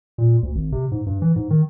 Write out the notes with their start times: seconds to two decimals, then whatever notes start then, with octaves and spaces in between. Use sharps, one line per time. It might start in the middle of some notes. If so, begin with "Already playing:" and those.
0.18 A#2
0.43 D2
0.55 G#1
0.72 C3
0.92 G#2
1.06 G2
1.22 E3
1.36 G#2
1.50 D#3